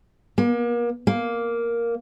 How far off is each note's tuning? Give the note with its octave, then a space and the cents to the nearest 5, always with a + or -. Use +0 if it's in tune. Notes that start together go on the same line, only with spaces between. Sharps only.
A#3 +35
A#3 +0